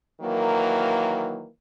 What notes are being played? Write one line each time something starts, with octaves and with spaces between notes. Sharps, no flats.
D#3 E3 F#3 A#3